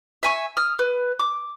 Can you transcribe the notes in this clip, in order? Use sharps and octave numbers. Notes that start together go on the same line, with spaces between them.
E5 G#5 C#6
D#6 F6
B4
D6